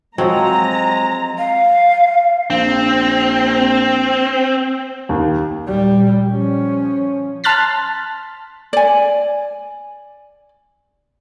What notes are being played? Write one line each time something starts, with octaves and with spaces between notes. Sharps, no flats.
F3 F#3 G#3 C4 A#5
F5
A#1 C4
D#2
A#2 G3
F3 C#4
A5 C6 F6 F#6 A6 B6
D5 G#5